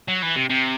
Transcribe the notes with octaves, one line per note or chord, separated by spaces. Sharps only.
F#3
E3
C3
C3